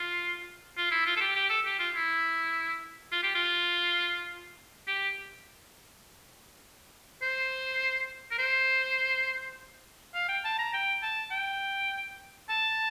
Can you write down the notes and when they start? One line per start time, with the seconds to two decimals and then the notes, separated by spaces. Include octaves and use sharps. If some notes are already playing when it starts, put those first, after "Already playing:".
Already playing: F4
0.77 F4
0.91 E4
1.06 F4
1.17 A4
1.21 G4
1.35 G4
1.50 A4
1.65 G4
1.79 F4
1.95 E4
3.12 F4
3.23 G4
3.35 F4
4.87 G4
7.22 C5
8.31 A#4
8.38 C5
10.14 F5
10.29 G5
10.44 A5
10.59 A#5
10.74 G5
11.03 A5
11.31 G5
12.50 A5